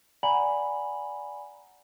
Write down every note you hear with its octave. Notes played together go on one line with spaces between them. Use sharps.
D5 F#5 G#5 A#5 B5 F#7